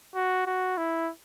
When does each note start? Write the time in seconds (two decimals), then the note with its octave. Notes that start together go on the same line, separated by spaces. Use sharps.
0.15 F#4
0.47 F#4
0.78 E4